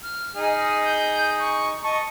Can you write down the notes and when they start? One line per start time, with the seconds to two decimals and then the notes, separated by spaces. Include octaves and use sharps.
0.03 F6
0.36 D#4 G#4 D#5
0.83 G6
1.39 C#6
1.84 D#5 A5 C#6 C#7